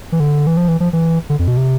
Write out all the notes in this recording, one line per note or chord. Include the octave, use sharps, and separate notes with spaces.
E3
D3
E3
F3
E3
F3
E3
D3
F2
B2
C3